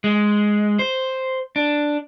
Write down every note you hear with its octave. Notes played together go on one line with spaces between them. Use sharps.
G#3
C5
D4